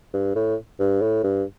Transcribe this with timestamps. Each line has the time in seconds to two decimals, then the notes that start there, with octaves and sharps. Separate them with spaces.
0.14 G2
0.35 A2
0.80 G2
1.01 A2
1.24 G2